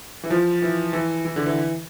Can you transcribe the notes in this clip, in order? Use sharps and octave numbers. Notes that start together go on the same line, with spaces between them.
E3
F3
E3
E3
E3
D3
E3